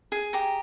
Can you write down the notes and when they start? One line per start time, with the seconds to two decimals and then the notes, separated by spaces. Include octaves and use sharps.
0.12 G#4
0.33 G4 A#5